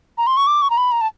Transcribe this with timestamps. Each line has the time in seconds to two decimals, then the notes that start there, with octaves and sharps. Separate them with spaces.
0.18 A#5
0.27 C6
0.37 C#6
0.47 D6
0.62 C#6
0.70 A#5
0.77 B5
0.92 A#5
1.01 A5